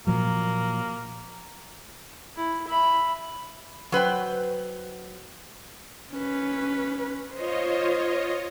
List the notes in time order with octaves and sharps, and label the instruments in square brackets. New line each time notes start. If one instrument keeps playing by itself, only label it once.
[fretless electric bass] A#2 F3 F#3 [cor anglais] A#3
[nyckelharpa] E4
E5 B5
[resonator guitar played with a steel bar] F#3 B4 C5 G5
[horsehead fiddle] C#4 B4
[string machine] F4 C#5 D#5 [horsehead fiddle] C5